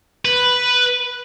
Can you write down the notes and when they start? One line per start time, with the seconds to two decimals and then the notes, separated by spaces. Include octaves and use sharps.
0.25 B4